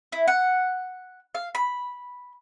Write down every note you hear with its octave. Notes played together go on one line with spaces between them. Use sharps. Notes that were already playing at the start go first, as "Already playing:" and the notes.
E4
F#5
F5
B5